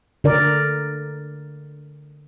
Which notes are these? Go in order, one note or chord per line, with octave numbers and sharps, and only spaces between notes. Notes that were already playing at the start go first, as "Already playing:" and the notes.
D3 A#4 D5